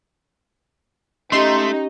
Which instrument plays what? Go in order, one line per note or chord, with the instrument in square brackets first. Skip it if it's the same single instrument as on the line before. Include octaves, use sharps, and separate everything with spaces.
[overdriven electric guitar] A3 [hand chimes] C#4 G4 [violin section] D#4 [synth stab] C6